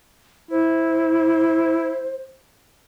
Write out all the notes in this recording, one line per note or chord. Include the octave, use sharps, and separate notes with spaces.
E4 C5